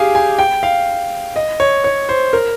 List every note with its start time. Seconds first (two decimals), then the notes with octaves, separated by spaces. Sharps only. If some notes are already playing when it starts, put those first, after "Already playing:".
Already playing: G4 G#4 F5 G#5
0.15 G#5
0.39 G5
0.63 F5
1.36 D#5
1.60 C#5
1.84 C#5
2.09 C5
2.33 A#4